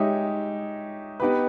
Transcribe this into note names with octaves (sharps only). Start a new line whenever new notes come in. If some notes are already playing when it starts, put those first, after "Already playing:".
Already playing: G#3 D#4 G4 C#5 E5
B3 D#4 G4 B4